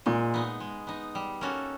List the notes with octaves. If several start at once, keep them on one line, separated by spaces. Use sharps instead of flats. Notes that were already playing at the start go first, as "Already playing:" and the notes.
A#2 G#3
B3 D#4
G#3
B3 D#4
G3
A#3 C#4 F#4 A4